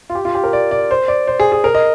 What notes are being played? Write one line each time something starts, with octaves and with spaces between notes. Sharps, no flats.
F4
G4
F4
G4
A#4
D5
D5
C5
D5
C5
G#4
G#4
A#4
D#5